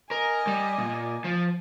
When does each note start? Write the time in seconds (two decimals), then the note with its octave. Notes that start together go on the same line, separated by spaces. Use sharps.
0.11 A#4 D#5 G#5
0.47 G3
0.78 A#2
1.24 F3